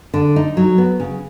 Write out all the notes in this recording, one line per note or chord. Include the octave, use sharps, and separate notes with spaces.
D3
D#4
F#3
B3
C#3